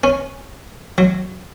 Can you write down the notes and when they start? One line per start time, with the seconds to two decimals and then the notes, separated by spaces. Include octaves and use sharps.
0.04 C#4
0.98 F#3